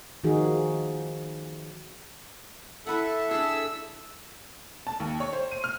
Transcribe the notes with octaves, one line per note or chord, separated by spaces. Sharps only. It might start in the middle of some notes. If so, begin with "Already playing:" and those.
D#3 F3 D#4 F#4 G#4
E4 A4 B4 E5 F#5
D4 G#4 E6
A5
D#2
C#5
C5
D#7
F6